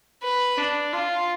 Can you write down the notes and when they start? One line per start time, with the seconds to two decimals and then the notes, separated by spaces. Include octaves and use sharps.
0.23 B4
0.58 D4
0.93 F4